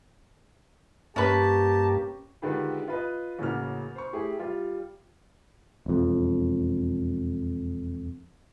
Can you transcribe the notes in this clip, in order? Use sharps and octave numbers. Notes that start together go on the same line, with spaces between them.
G2 A#3 C#4 G4 B4 A5
D3 D#3 G#3 F4 G4 B4
F4 B4 D#5
A1 C#3 A#3 F#4 F6
C5 C#6
A3 E4 G4 G#4
G3 F4
E1 F2